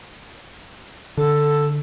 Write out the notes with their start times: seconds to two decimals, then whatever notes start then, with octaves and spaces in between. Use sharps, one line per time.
1.17 D3 A4